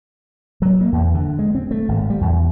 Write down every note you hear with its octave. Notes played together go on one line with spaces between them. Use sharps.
F#3
A#3
E2
D3
G#3
C4
A3
G#1
G3
E2